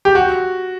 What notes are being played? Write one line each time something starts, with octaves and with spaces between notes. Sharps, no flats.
G4
F#4